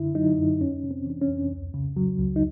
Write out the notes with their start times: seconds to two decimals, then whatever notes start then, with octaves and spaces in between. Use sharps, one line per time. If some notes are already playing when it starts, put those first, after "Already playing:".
Already playing: F#2 D3 E4
0.15 F#3 D#4
0.38 F#2
0.61 F2 C#4
0.83 C3
0.91 C4
1.06 E3 D4
1.21 C#4
1.29 F2
1.51 C#2
1.74 C#3
1.97 F#3
2.19 C#2
2.36 D#4